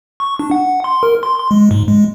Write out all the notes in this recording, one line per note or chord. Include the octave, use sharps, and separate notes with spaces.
C#6
D4
F#5
C6
A#4
C6
C6
G#3
G#2
G#3